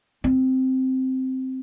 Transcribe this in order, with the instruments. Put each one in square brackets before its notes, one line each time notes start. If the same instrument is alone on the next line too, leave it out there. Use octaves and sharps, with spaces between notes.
[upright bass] C4